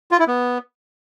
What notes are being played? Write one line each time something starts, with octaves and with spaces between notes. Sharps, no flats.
F4
E4
B3